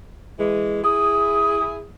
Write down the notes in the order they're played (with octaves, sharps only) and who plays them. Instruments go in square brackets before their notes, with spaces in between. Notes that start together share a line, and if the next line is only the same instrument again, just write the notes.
[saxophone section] E3 G#3
[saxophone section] E4 G#4 [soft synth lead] D#6